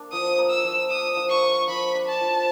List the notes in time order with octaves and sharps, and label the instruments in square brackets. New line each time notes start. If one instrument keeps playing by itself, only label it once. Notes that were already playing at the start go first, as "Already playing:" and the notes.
Already playing: [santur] A#3 D4
[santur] F3 [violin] D#6
[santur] A#3
[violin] E6
[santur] F3
[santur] D4 [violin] D#6
[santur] F3
[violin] C#6
[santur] A#3
[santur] F3 [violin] B5
[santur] D4
[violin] A5
[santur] F3